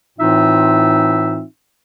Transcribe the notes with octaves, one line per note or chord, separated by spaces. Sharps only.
A2 E3 C4 D#4 F4 E5